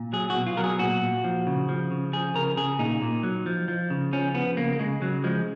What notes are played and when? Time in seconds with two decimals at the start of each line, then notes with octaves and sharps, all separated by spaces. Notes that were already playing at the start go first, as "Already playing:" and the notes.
Already playing: A#2
0.13 F#3 G#4
0.30 F#4
0.35 B2
0.47 F4
0.57 F#3 A#4
0.64 G#4
0.79 A#2 F#4
1.02 A#2
1.24 F3
1.47 C#3
1.69 F3
1.91 C#3
2.13 F3 G#4
2.35 C#3 A#4
2.57 C#3 G#4
2.79 A#2 D#4
3.02 A#2
3.23 F#3
3.46 F3
3.68 F3
3.90 C#3
4.13 F3 C#4
4.35 F3 B3
4.57 C#3 A#3
4.72 A#3
4.79 C#3 G#3
5.02 C#3 F#3
5.24 F3 G#3